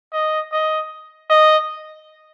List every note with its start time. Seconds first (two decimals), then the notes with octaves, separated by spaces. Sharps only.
0.13 D#5
0.52 D#5
1.30 D#5